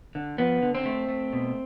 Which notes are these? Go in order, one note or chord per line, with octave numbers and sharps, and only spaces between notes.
D3
F3 B3
D3
C4
A3
A3
B2